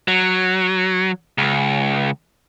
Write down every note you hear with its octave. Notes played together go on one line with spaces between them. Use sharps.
F#3
C#2